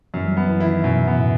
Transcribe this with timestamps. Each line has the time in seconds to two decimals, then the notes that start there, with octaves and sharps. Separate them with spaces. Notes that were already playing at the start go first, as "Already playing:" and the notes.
0.14 F#2 E3
0.26 G3
0.31 F#3
0.37 B3
0.49 E3
0.60 E4
0.66 D#3
0.84 F#2 B2
1.07 B3
1.18 A2